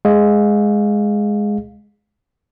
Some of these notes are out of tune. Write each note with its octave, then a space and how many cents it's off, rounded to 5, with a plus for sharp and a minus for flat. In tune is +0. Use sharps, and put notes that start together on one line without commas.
G#3 +0 F5 +20